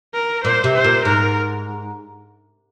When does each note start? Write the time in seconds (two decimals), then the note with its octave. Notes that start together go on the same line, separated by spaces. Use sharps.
0.14 A#4
0.44 A#2 C5
0.64 C3
0.74 C5
0.84 A#2
1.05 G#2 A#4